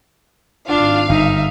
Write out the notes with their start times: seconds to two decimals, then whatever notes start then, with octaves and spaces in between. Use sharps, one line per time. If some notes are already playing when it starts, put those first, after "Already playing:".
0.68 G#1 D4 F4 F5
1.09 G1 D#4 E5